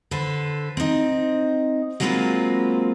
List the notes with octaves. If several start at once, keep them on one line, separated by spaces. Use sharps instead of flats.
D3 A4 B4 C5
C4 D#4
F#3 G#3 A#3 C4 F4 B4